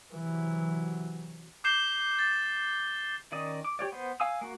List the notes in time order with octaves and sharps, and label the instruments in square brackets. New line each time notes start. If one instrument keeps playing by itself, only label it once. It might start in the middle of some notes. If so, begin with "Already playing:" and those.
[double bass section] C3 F#3 [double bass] E3
[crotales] D6 G6 C7 E7 G7
A6
[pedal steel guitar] D#3 C#4 D5 D#5 D#6
D6
G4 C#5 D5
B3 C5
F5 G#5 D#6 E6
A#3 F#4